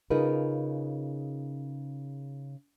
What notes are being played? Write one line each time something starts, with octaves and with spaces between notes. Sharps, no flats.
C#3 D#4 F4 G#4 A#4 B4